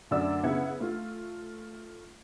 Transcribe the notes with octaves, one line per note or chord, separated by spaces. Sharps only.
F#2 D3 A3 D5 E5 E6
C#3 B3 E4 F#5 G#6
A3 F4